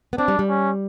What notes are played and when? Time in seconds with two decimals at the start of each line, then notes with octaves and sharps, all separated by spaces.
0.13 B3
0.18 C4 D4
0.28 G3
0.39 G3
0.49 C#4